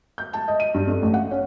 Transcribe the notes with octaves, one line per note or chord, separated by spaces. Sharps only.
G6
A5
D#5
D#7
G2
F2
A1
F#5
C#4